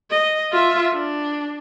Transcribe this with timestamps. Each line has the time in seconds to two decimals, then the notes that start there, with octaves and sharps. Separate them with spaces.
0.10 D#5
0.51 F4 E5
0.94 D4